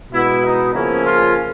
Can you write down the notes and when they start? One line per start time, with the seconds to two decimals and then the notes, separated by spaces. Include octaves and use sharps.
0.12 B2 G#3 B3 E4
0.44 D#4
0.74 C#3 F3 A#3 C#4 E4
1.05 F4